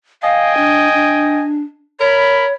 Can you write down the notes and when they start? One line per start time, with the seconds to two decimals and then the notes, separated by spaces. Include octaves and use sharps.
0.22 D#5 F5 G5 G#5
0.57 D4
0.94 D4
2.00 A#4 C#5 B5